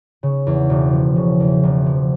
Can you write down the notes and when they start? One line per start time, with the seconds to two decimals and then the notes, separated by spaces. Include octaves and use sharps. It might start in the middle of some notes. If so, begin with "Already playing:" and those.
0.23 C#3
0.47 E2
0.70 E1
0.93 F3
1.16 C#3
1.40 E2
1.63 E1
1.86 F3